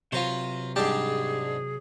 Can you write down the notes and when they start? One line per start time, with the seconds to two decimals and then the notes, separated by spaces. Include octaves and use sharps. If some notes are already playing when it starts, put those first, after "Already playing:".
0.12 C3 F#3 F4 B4 C5
0.76 G#2 G3 D4 G4 G#4 A5